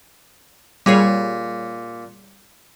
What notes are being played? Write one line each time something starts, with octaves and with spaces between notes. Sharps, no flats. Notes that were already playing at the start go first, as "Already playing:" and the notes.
A#2 G3 G#4 C#5